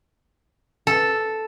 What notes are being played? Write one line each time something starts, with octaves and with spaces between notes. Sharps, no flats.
A4